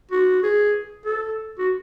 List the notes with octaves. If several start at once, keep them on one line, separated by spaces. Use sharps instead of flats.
F#4
G#4
A4
F#4